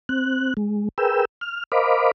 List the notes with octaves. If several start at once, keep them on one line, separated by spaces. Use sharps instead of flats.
C4 F#6
G#3
G#4 A#4 B4 G5 E6
F6
A#4 C5 D#5 F5 B5 D6